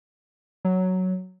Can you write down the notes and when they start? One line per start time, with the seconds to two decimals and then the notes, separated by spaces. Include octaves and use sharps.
0.65 F#3